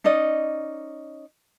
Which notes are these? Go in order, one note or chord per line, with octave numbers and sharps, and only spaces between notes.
C#4 D#4 D5 D#5